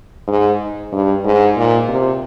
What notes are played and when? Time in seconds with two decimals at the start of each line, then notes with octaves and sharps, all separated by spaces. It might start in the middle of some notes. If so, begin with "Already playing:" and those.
0.27 G#2
0.92 G2
1.24 G#2
1.56 A#2
1.88 C3